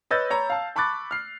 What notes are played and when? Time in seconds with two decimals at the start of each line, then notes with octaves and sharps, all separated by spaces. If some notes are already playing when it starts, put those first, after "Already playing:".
0.11 B4 C#5 D#5 E6 G6 A6
0.30 C#5 A#5 B5
0.50 F5 A5
0.76 A5 B5 C#6 D6 F#6 A6
1.11 F6 C7